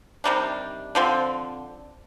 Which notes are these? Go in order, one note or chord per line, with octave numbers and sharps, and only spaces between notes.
C3 D#3 G3 D4
D3 F3 C4